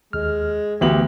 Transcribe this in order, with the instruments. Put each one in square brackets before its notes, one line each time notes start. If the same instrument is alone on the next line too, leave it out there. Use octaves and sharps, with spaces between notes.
[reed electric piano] D#2 F6 [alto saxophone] G#3
[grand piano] D2 F#7 [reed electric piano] E3 B3 F#4 [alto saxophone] G4